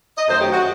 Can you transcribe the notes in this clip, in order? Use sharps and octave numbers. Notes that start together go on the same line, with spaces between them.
D#5
F#2 D#3 F#3 A3 C5
G4
F#4